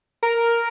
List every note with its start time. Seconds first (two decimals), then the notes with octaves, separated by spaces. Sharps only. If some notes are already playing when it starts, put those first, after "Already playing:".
0.23 A#4